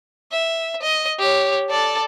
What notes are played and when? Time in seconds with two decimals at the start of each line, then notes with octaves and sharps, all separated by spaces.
0.32 E5
0.82 D#5
1.19 G4 C#5
1.70 A4 D5